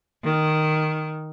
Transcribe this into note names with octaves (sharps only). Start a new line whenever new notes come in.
D#3